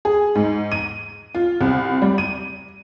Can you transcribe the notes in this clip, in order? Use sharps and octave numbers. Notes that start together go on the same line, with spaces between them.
G#4
G#2
D#7
F4
C2
G3
D#7